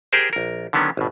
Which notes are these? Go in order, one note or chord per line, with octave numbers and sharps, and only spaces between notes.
G4 G#4 A#4 C5
A#1 A#4
D3 D#3 F#3 B3 C#4 D4
G#1 B2